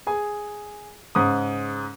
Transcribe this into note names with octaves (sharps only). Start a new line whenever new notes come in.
G#4 G#5
G#2 C#3 D#6